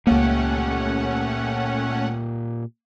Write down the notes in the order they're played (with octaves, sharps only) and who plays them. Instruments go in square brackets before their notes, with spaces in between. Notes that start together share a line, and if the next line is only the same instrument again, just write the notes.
[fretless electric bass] C#2 A#3 [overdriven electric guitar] A#2 G4 [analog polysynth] A3 C#4 F#5